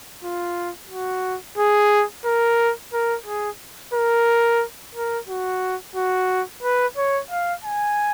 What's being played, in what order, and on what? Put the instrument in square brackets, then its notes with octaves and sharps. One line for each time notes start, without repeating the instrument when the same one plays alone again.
[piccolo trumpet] F4
F#4
G#4
A#4
A#4
G#4
A#4
A#4
F#4
F#4
B4
C#5
F5
G#5